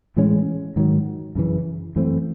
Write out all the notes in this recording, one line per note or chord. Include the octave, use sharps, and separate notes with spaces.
A2 E3 G#3 C#4
G#2 D#3 F#3
F#2 C#3 E3
F#2 E3 A3 C4